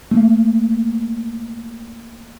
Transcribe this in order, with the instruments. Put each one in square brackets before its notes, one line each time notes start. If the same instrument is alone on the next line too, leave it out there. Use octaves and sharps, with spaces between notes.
[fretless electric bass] A3 A#3